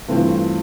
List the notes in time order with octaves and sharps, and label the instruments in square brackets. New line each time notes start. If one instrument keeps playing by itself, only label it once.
[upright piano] G2 E3 A3 C4 F4